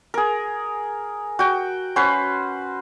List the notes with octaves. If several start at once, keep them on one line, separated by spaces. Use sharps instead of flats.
G#4 A#4
F#4 G5
C#4 F#4 B4 C5